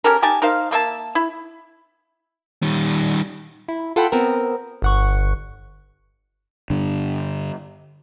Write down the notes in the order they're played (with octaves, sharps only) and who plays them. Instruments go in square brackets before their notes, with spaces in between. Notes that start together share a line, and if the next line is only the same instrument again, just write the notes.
[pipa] C#4 G4 A4 A#4
D#4 G4 G#5 A5
D#4 A#4 C5 F5
A3 A#3 E5 A5
E4
[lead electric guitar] D#3 G3
[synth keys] E4
F4 A4 F#5 G5 B5
B3 C4 A#4
G1 F#5 C#6
[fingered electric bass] G2 D3